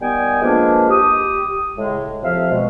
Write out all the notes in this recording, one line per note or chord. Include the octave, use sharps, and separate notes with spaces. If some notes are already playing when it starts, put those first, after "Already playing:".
D#3 G3 B3 G5 G#5
F3 G#3 A#3 D4 A#4 B4
G4 D#6
A2 C#3 G#3
F2 C3 F3 E5 F5
B2 G#3